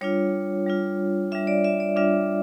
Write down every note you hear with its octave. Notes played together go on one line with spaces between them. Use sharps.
G3 D4 F4 C#5
G3 D4 F4
G3 D4 F4 E5
D5
E5
D5
G3 D4 F4 E5